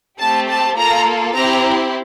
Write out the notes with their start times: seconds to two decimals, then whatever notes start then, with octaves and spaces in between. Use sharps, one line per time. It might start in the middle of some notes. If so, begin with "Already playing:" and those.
0.20 A3 C4 G4 A5
0.49 A5
0.77 A#3 F4 A4 A#5
1.35 C4 E4 G4 A#5